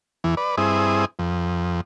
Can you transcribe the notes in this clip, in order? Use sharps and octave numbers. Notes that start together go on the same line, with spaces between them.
E2 E3
B4 D5
G2 C4 E4 G#4 D#6
F2